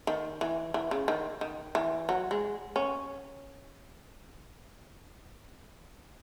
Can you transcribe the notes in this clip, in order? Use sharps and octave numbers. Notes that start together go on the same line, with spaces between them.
D#3
E3
E3
C#3
D#3
D#3
E3
F#3
G#3
C#4